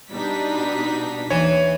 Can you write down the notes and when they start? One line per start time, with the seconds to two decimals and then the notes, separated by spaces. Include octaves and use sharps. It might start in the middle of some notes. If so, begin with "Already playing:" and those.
0.11 B2 G3 D4 D#4 B6
1.30 D#2 E3 C#5